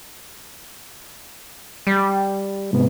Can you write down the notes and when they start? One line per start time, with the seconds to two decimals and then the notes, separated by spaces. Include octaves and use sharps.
1.87 G3
2.73 G#2 C3 B3